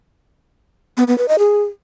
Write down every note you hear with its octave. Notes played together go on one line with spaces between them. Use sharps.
B3
B3
B4
D#5
G#4